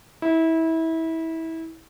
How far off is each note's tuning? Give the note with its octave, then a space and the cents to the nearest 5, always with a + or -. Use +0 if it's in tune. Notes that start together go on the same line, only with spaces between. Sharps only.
E4 -25